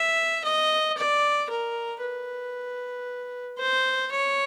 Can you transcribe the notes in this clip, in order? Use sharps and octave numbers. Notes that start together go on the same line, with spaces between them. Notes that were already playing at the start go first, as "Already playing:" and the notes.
Already playing: E5
D#5
D5
A#4
B4
C5
C#5